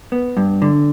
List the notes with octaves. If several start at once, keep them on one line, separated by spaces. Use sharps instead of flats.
B3
G2
D3